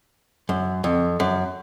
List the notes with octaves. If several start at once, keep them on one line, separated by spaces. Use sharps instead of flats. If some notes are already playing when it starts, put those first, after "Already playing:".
F#2
F2
F#2